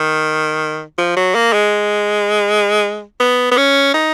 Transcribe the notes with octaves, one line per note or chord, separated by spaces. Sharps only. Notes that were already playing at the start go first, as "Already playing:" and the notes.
Already playing: D#3
F3
F#3
A#3
G#3
B3
B3
C#4
D#4